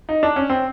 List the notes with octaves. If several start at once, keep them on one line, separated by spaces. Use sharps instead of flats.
D#4
D4
C#4
C4